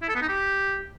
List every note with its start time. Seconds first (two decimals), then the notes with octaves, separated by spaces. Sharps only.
0.02 E4
0.09 A4
0.15 B3
0.22 D#4
0.29 G4